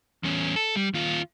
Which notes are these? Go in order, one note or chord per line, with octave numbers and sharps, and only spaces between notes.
E2 C#4
A4
G3
D#2 F4